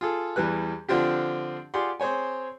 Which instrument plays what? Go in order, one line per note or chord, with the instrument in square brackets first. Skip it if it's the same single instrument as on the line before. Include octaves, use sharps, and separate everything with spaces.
[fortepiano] F4 G#4 A4
E2 E3 G3 B4 F#6
D3 F3 C4 D4 F4 G4
F4 G4 G#4 D5 F#5 C6
C4 G#4 C5 C#5 G#5